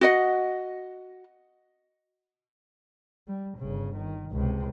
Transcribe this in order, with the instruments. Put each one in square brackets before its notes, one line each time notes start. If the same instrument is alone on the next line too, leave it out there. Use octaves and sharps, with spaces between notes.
[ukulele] F#4 D#5 F#5
[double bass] G3
G1 C#3
D#3
C#2 C3